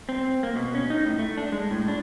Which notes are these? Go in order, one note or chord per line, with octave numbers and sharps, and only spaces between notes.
C4
A#3
B2
C#4
D#4
A2
A3
D4
G#3
A2
D4